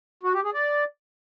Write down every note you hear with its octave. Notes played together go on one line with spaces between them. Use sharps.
F#4
G4
G#4
D5